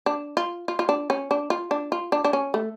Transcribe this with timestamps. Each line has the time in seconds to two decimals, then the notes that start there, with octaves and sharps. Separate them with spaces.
0.06 D4
0.37 F4
0.68 F4
0.79 F4
0.89 D4
1.10 C#4
1.31 D4
1.50 F4
1.71 D4
1.92 F4
2.12 D4
2.24 D4
2.33 C#4
2.54 A3